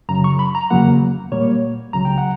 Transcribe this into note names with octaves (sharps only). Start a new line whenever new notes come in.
F#2 C#3 F#3 A#5
C#6
B5
A#5
E2 C#3 F#3 A#3 F#5
A#2 G3 A#3 C#5
C#2 C#3 F#3 A#5
G5
F#5